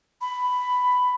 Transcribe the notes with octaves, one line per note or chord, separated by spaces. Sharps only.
B5